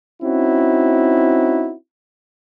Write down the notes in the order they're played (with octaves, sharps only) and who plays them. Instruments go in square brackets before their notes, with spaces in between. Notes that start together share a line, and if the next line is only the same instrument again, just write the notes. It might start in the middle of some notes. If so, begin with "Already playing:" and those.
[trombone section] C4 C#4 D#4 E4 F#4